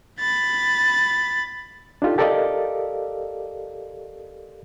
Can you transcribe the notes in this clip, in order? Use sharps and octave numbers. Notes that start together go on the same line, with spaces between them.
B5 A6
D4 D#4 F4 G4 A4
G4 A4 A#4 D5 D#5 F5